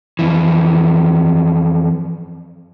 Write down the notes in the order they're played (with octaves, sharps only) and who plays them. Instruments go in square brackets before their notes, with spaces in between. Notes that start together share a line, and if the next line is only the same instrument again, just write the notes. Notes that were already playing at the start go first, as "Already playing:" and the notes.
[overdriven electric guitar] F2 E3